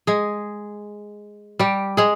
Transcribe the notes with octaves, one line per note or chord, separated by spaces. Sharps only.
G#3 G#4
G3 G4
G#3 G#4